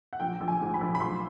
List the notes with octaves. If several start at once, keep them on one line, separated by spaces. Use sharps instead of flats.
F#5
A#1 G5
A#1
G#5
G#2
B5
A#1
B5
B1 C6